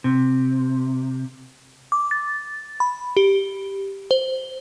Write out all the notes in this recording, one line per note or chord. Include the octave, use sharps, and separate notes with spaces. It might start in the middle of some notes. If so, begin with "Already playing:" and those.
C3
D6
A6
B5
G4
C5